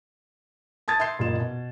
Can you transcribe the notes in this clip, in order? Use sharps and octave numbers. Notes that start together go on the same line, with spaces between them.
A5 D#6 G#6 A6
E5 C6 G6 C7
F#1 A#2 D#5 E7
B2